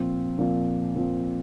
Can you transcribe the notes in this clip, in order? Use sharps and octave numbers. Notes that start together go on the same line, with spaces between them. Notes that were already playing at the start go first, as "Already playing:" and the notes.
Already playing: A#2 F3 C4
A#2 F3 C4
A#2 F3 C4